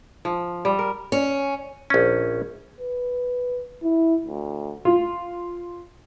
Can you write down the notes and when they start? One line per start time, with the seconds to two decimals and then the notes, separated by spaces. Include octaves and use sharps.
0.25 F3
0.65 G3
0.79 A#4
1.12 C#4
1.90 A#1 C#4
2.80 B4
3.83 E4
4.26 D2
4.85 F4